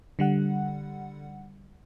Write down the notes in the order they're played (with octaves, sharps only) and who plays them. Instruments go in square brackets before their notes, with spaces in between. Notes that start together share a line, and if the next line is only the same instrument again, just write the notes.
[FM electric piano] D3 G3 F#5